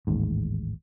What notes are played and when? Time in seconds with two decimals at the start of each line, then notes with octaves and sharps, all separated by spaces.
0.07 A1 D#2 G#2